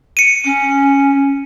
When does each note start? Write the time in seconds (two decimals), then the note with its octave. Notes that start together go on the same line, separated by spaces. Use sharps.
0.17 C#7 D#7
0.45 C#4